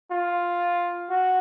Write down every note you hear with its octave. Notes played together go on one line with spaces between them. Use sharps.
F4
F#4